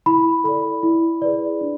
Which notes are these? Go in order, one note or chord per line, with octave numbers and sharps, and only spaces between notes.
E4 B5
A4 D5 B5
E4
G#4 B4 D5
D4